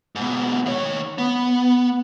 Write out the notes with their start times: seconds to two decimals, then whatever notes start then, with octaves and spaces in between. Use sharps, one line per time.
0.15 G#2 B2
0.66 D#3 C#5
1.18 B3